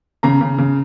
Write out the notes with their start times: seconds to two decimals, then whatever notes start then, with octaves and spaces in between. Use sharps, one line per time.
0.23 C#3 A#5
0.41 C#3
0.58 C#3